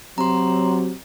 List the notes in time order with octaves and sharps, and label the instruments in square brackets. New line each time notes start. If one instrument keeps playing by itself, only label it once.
[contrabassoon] C3 [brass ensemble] F#3 [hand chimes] A#5 C6